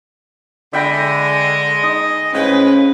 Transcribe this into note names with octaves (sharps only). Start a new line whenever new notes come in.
D3 G#3 D#5 E5 G5 B5
D#4
A2 F3 G#3 C#4 B4